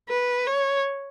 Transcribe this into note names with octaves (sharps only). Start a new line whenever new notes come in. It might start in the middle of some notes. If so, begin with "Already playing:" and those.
B4
C#5